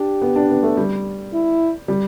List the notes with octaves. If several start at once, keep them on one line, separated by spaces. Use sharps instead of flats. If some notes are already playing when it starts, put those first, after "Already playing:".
Already playing: D4 G4
B3
D4
B3
A3
G3
E4
G3